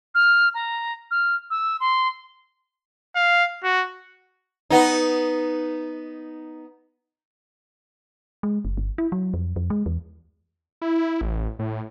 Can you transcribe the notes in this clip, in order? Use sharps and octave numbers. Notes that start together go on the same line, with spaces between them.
F6
A#5
F6
E6
C6
F5
F#4
B3 D#4
G#3
F#1
G1
E4
F#3
F2
F2
G#3
E2
E4
A1
A2